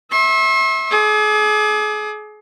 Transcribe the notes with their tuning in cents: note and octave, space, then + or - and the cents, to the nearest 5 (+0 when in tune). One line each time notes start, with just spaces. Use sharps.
E5 -20 C6 +45
G#4 +35 D6 +30